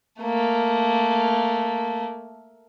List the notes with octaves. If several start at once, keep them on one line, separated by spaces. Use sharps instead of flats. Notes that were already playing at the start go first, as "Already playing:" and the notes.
A3 A#3